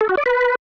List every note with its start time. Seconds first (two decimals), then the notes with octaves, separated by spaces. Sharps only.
0.01 A4
0.09 F#4
0.17 D5
0.26 B4